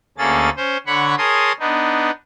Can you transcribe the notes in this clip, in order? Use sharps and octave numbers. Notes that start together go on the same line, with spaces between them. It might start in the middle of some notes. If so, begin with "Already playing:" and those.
D2 A#3 C#4 G#4 A4 A6
C#4 C5
D3 C#5 F#5 B5 C#6
G#4 A#4 C#5 A5 C6 D#6
B3 D4 D#4